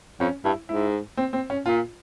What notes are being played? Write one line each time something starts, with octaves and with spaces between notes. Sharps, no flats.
F2 C#4
G2 E4
G#2 E4
C4
C4
C#4
A#2 F4